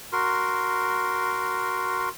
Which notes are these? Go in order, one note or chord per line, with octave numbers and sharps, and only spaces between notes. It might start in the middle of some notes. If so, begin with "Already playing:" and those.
F#4 A#4 C6